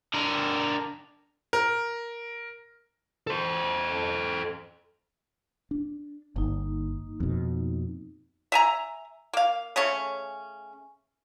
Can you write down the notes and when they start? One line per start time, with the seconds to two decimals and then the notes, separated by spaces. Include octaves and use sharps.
0.14 D3 A#4
1.53 A#4
3.27 A4 C5
5.71 D4
6.36 G1 A#3 D#4
7.20 F2 B2
8.52 E5 G#5 A#5
9.33 A#3 F5
9.76 C#3 A3 C#4